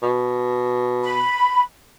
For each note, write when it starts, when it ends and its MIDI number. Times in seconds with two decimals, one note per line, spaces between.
0.03 1.25 47
1.03 1.61 83